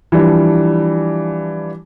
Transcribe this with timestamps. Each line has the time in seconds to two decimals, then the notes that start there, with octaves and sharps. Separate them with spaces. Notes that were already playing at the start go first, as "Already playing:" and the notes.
0.12 E3 F3 G3 D4